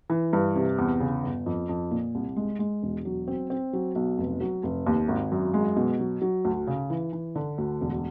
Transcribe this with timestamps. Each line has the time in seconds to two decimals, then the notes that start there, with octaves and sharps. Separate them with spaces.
0.10 E3
0.33 G2
0.55 C3
0.78 E2
1.00 C#3
1.23 G1
1.46 F2
1.69 F2
1.91 A#2
2.15 C2
2.36 G#3
2.59 G#3
2.83 E1
3.05 F#3
3.28 C4
3.50 C4
3.73 F#3
3.95 B1
4.18 F1
4.41 F#3
4.63 F1
4.86 D#2
5.08 G#1
5.32 F#2
5.54 G#3
5.76 B2
5.99 F#3
6.22 F#3
6.45 D2
6.67 C#3
6.90 E3
7.13 E3
7.35 D3
7.58 D2
7.81 E1